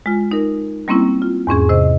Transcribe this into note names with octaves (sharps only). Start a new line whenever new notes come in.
G#3 F4
D#4 A#4
G3 A#3 C4 C#4 E4
F4
E2 G#2 C#4 G#4
C3 C5 D#5